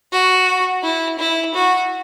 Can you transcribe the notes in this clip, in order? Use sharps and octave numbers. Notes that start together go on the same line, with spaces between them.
F#4
E4
E4
F#4